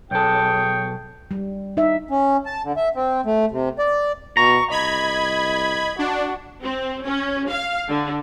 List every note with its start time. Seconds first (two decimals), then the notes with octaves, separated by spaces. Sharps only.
0.11 B1 G#4 A4 C#5 G5
1.31 G3
1.77 D#4 E5
2.11 C#4
2.46 A5
2.64 D3
2.77 E5
2.95 C4
3.26 A3
3.51 C3
3.79 D5
4.37 B2 A#5 C#6
4.71 C2 D#5 B5 G#6
5.99 D4 F#4
6.62 C4
7.05 C#4
7.50 F5
7.88 D3